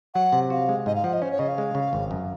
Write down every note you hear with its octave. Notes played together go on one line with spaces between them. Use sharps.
F#3 F#5
C3
F#4 F5
G#3
G#2 D#5
F5
F3 F#5
D#5
C#4 C5
C#5
C#3 D#5
F5
G#3
C#3
G#1
F#2